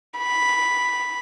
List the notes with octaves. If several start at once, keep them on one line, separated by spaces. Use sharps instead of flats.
B5